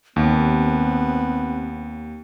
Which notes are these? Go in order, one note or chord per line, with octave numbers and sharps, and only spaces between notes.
D#2 B3 C4